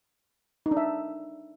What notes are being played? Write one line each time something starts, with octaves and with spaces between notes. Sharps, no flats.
D#4
D4
E5